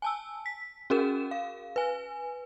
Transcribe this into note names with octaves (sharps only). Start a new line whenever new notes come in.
G#5 A5 E6
B6
C#4 F#4 G#4 A#4 E7
F5
B4 G#5